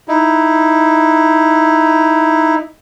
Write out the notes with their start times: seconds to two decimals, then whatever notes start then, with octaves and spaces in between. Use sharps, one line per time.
0.08 D#4 E4